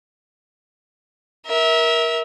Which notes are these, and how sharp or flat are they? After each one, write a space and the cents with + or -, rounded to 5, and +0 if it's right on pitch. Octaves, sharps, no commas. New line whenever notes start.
A#4 +15 E5 -25